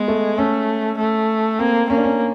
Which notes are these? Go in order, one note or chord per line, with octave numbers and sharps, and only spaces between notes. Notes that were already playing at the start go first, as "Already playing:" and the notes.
Already playing: G#3 B3
A3
A3 C#4
A3
A#3 C4
A#3 C#4
D4
C#4